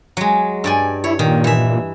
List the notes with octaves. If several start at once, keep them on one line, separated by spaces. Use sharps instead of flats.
F#3 G#3
G2 D5 G#5
E4 C#5
A#2 D#3
E3 E5